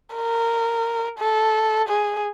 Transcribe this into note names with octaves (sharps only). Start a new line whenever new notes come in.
A#4
A4
G#4